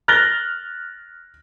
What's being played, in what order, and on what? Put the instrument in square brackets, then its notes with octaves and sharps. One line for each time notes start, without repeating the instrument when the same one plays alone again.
[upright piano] F6 F#6 A6 A#6 G7